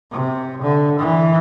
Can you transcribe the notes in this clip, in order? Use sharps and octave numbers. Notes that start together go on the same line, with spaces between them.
C3
D3
E3